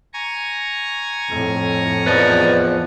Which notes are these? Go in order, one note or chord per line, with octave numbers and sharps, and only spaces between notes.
G#5 A#5 C#6
F2 A2
E2 F3 B4 D5 D#5